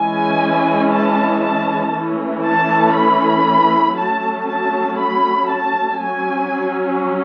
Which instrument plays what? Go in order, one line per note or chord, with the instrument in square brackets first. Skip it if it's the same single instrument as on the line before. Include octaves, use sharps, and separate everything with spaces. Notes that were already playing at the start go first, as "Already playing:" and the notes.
Already playing: [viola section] E3 G#3 C#4 G#5
A5
A5
E3 A3 C#4
A5
B5
F#3 A3 C#4 A5
A5
B5
A5
F#3 C#4 G#5